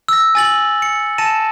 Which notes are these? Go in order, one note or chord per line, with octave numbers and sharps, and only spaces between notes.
E6 A#6
G#5 A6 F#7
C#7
A5 A6 A#6 C#7 D#7 E7